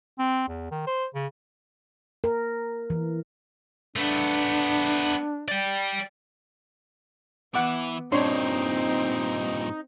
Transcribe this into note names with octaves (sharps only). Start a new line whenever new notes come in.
C4
E2
D#3
C5
C#3
A#4
E3
A3 B3 D4
D5 G5
E3 B3 E4 F#5 D6
G2 A#2 C4 D4 D#4 C#5 C6